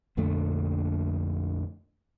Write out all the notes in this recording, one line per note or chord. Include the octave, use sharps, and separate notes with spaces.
A#1 F2 D3 A3